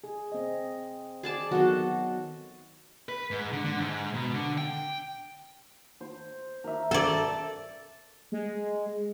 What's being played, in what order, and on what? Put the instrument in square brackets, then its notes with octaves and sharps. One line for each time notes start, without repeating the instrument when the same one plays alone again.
[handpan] G#4
C4 D#5
[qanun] G#4 D5 A5
[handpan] D#3 F#3 B3 [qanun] F#4 A4
[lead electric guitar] B4
G#2
D3
D3
G#2
B2
D3
G5
[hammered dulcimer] C5
A#4 E5
[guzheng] A4 D5
[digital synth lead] G#3